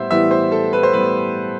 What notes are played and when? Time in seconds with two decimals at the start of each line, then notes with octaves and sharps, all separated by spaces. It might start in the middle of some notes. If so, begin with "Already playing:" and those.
Already playing: A2 G3 B3 C5 E5
0.11 A2 E3 G3 B3 E5
0.31 C5
0.52 A4
0.73 B4
0.83 C5
0.93 A2 E3 G3 B3 B4